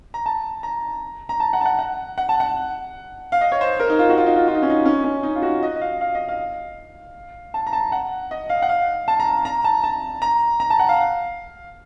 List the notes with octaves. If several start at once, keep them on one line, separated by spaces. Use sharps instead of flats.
A#5
A5
A#5
A#5
A5
F#5
A5
F#5
F#5
F#5
A5
F#5
F5
D#5
C#5
C5
A#4
D#4
F4
F#4
F4
D#4
F4
F4
D#4
C#4
D#4
C#4
C#4
D#4
F4
F#4
D#5
D#5
F5
F5
D#5
F5
A5
A#5
A5
F#5
D#5
F5
F#5
F5
A5
A#5
A#5
A5
A5
A#5
A#5
A5
F#5
F5